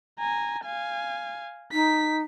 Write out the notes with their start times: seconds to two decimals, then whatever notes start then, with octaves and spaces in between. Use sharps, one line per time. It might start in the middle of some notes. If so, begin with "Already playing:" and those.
0.19 G#5 A#5
0.65 F5 G#5
1.73 D#4 B6